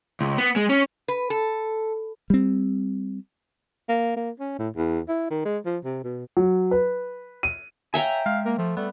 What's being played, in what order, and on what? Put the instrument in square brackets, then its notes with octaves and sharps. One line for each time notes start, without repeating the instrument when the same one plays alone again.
[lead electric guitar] C#2
B3
G#3
C#4
[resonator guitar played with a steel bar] B4
A4
[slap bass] G3 C4
[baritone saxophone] A#3
A#3
C#4
A2
E2
E4
D#3
G#3
F3
C3
B2
[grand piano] F#3
B4
D#7
[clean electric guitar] C#5 F5 G#5 [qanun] E5 G5 A#5
[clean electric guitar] G#3 [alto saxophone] F5
[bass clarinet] A#3 [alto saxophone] A#4
[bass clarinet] F3 [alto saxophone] A3
[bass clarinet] G3 [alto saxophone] A3 [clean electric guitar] B3